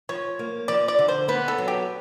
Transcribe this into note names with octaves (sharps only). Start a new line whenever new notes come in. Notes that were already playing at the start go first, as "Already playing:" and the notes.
F3 C#5
A#3
F3 D5
D5
D3
C5
B3 B4
A4
F#3
G4